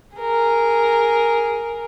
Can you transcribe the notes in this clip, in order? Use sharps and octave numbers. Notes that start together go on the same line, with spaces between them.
G#4 A#4